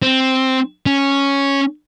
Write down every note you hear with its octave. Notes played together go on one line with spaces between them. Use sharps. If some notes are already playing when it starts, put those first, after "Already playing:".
C4
C#4